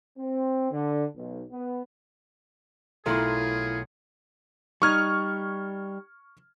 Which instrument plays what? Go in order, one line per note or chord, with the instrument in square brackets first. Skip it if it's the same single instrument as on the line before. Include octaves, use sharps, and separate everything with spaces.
[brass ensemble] C4
D3
B1
B3
[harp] B1 C6 [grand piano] A3 F4 A#4 [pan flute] E4 [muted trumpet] G#4
[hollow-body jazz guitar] G3 D#4 [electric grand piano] C#6 F6 G#6